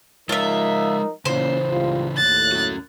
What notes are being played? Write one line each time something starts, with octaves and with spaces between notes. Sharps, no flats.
F3 G#3 D#4 F4 A#4 C#5 E5
A#2 C#3 E3 A#3 C#4 C5
C#2 G3 F4
D#2 A2 F#6 A6
C#4 F#4